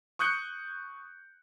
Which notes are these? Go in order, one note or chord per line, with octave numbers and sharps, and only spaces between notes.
C#6 D#6 F#6 G6 C#7